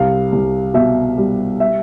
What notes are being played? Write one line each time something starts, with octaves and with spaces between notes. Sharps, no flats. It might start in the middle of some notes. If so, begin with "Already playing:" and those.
Already playing: C2 F5
C2
B2 E5
G3
E5